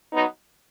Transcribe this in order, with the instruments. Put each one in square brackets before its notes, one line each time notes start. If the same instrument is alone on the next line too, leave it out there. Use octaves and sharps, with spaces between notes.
[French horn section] F#3 B3 D#4